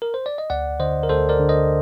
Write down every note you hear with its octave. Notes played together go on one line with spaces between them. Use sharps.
A#4
C5
D5
D#5
D2 D5 F#5
D3 C5 D#5
A#4
D2 A4 C5
A#4 D5
D3
C5 D#5